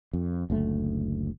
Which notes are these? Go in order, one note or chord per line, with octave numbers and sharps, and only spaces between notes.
F2
F#1 D2 A3